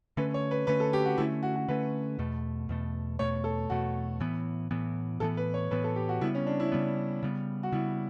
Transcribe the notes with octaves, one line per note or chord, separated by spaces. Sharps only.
D3 A3 C#4 B4
C#5
B4
D3 A3 C#4 B4
A4
G4
F#4
D3 A3 C#4 E4
F#4
F#4
D3 A3 C#4 B4
E2 B2 A3
E2 B2 A3
E2 B2 A3 C#5
A4
E2 B2 A3 F#4
A2 E3 B3
A2 E3 B3
A2 E3 B3 A4
B4
C#5
A2 E3 B3 B4
A4
G4
F#4
C#3 G3 B3 E4
C#4
D4
E4
C#3 G3 B3
C#3 G3 B3
F#4
C#3 G3 B3 E4